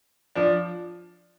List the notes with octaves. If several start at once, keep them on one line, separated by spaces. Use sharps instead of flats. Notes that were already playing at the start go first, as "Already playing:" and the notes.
F3 D4